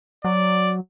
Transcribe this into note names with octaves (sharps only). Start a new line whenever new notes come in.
F#3 D5